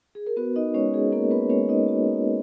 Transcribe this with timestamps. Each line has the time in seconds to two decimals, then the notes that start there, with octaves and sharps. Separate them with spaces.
0.15 G#4
0.27 A#4
0.37 B3 F#4 B4
0.56 D#4 D#5
0.74 G#3 C#4 C#5
0.94 G#4
1.12 A#3 D#4 A#4
1.31 B3 B4
1.50 G#3 C#4 C#5
1.69 D#4 D#5
1.88 F#4
2.26 G#3